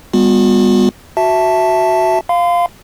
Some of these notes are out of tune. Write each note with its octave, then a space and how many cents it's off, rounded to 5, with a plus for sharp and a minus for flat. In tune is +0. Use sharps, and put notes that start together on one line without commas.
G3 +40 B3 +0 F#4 -45
F#4 +0 E5 +0 A5 +0
F5 +0 C6 -40